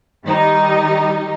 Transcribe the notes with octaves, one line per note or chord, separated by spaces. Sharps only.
D#3 G3 D#4